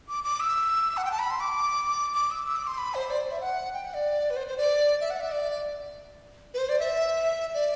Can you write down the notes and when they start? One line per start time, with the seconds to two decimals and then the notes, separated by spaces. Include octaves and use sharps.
0.08 D6
0.24 D6
0.40 E6
0.97 F#5
1.05 G5
1.12 A5
1.19 B5
1.30 C6
1.40 D6
2.14 D6
2.31 E6
2.46 E6
2.57 D6
2.67 C6
2.78 B5
2.95 C5
3.10 D5
3.21 C5
3.31 E5
3.41 F#5
3.74 G5
3.84 F#5
3.94 D5
4.30 B4
4.36 C5
4.48 C5
4.58 D5
5.01 E5
5.10 F#5
5.21 E5
5.32 D5
6.54 B4
6.58 C5
6.69 D5
6.79 E5
7.54 D5